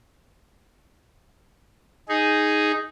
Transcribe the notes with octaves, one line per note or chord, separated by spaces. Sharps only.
D#4 G#4